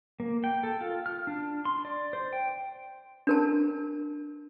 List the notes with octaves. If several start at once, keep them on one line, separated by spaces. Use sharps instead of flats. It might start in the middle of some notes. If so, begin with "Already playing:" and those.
A#3
G5
A4
F4
F6
D4
C6
D5
C5
G5
D4 A#4 A5